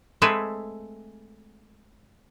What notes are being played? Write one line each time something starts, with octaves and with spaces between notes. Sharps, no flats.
G#3 A3 C4 A4 B4 G#5